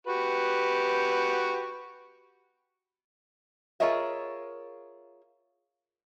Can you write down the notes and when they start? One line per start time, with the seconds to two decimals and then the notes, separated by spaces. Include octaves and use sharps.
0.07 F#4 G4 B4
3.80 F4 G#4 A#4 C#5 D#5 E5